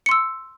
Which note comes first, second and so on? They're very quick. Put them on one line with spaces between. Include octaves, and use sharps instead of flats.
C#7 C6 E6